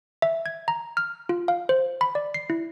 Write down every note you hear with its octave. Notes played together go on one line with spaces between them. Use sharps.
E5
G#6
A#5
F6
F4
F5
C5
B5
D5
C7
E4